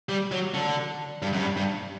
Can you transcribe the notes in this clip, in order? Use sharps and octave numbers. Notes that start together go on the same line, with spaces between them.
G3
F#3
D3
G2
F#2
G2
G2